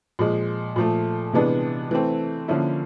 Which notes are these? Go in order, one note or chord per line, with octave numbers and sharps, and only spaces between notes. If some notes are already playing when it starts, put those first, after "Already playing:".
A#2 F3 G#3
A#2 F3 A3
C3 E3 G#3 B3 D4
E3 A3 C4
D3 F3 A#3 C#4 E4